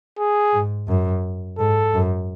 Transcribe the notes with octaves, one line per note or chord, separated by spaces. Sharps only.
G#4
G#2
F#2
G#2 A4
F#2